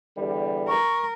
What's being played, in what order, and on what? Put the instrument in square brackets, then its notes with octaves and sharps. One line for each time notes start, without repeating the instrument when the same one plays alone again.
[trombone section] E2 D3 G3
[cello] A#4 [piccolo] C#6